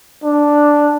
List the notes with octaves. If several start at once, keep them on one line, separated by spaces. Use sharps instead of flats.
D4